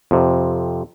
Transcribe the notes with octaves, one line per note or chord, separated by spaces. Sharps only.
F2 C3